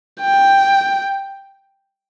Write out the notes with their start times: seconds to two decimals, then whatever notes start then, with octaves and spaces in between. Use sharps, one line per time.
0.21 G5